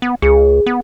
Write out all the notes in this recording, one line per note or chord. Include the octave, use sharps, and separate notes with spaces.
B3
C#2 G#4
B3